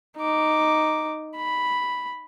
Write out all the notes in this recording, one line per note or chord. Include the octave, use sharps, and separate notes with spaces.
D#4 D6
B5